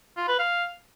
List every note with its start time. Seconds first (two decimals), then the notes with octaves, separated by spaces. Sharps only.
0.17 F4
0.28 B4
0.39 F5